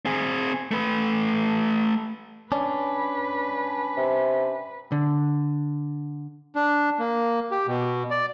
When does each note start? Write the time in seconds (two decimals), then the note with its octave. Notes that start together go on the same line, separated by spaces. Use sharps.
0.05 C4 G#4
0.71 A3 B4
2.52 C#4 D4 B4
3.97 C3
4.92 D3
6.56 D4
6.99 A#3
7.51 G4
7.67 B2
8.11 D5